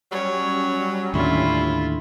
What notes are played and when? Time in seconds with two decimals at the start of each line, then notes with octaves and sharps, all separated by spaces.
0.12 F#3 G3 C#4 C#5
1.14 D#2 A2 D3 E4 F4